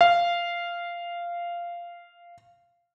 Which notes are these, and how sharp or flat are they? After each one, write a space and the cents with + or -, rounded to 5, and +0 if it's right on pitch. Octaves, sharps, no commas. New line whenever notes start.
F5 -10